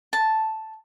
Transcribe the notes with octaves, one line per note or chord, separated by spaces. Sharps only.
A5